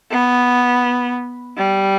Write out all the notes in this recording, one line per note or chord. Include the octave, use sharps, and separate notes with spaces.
B3
G3